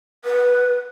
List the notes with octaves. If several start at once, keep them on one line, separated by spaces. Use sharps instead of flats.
B4